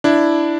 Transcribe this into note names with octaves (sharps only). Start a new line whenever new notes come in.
D4 E4